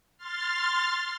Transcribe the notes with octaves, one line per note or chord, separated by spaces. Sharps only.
C6 F6 A6